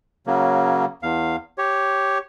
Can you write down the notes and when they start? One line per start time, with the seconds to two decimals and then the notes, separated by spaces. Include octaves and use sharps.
0.27 C#3 F#3 A#3
1.03 E2 F5
1.58 G4 C#5